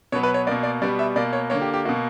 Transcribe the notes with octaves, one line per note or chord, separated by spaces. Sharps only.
B2 F#3 B3 C#5
B4
C#5
B2 A#3 D5
D5
B2 G3 B3 D5
E5
B2 A#3 D5
C#5
D3 A#3 C#5
G4
G4
B2 A#3 F#4